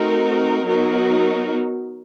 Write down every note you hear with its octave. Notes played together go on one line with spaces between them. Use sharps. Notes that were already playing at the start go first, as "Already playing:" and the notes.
Already playing: A3 C4 D#4 F#4 A#4
F#3 B3 D#4 F#4 A#4